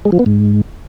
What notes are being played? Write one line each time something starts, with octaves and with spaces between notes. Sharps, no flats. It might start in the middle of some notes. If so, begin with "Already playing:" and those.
G#3
F3
B3
G#2